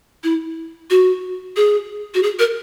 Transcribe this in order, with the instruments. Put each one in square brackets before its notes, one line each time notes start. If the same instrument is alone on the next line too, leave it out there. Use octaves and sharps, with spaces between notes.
[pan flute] E4
F#4
G#4
F#4
G#4
A#4